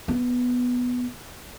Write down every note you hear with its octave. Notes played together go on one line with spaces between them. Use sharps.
B3